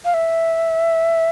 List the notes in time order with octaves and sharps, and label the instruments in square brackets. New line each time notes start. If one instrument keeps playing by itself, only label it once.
[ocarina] F5
E5